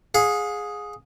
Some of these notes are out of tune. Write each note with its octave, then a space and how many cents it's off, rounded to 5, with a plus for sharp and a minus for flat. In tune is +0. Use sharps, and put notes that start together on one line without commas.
G#4 +0 F5 +45